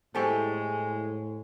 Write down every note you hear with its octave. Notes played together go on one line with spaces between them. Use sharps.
A2 G#3 E4 G4 A4 C5 G#5 C#6